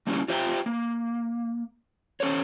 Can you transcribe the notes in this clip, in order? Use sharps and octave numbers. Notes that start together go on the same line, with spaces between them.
G3 A3 A#3 C#4 E4 F#4
F4 G4 C5 E5 F5 G5
A#3
C#4 A4 C5 C#5